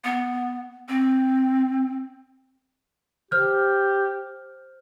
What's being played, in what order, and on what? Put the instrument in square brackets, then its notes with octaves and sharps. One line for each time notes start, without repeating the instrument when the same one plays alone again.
[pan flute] B3
C4
[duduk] G4 [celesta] C5 F6 G6